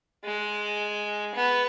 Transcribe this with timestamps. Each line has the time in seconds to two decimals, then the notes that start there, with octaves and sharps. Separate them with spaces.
0.25 G#3
1.35 B3